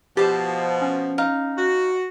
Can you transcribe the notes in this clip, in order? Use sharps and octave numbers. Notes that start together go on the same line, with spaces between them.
B2 F3 G4 C5 A5
C#4
D#4 F5
F#4